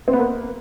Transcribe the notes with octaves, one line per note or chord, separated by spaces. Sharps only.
C4
B3
A#3